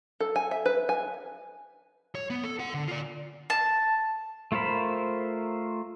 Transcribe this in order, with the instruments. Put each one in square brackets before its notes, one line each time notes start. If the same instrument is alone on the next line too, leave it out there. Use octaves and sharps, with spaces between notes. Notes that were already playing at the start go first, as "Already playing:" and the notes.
[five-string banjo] A4
G#5
E5
B4
G#5
[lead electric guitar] C#5
B3
A4
A4 F#5
D3
F4 D5
[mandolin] A5
[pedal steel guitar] A3 F4 A#4 C5 B5